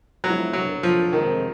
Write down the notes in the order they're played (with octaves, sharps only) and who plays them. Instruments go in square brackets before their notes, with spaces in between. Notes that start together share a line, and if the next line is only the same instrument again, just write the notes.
[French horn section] F3 G#3 B3 E4 [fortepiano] F#3
[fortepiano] F#3
F3
[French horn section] F2 C3 F3 G#3 C4 [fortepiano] D#3